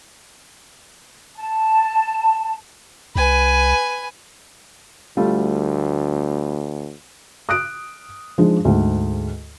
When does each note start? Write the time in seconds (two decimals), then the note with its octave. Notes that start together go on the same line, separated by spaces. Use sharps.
1.36 A5
3.16 C2 B4 G#5
5.17 D2 G3 A3 F4
7.49 D#6 F#6 D7
8.38 F3 G#3 D4 D#4
8.65 D2 G#2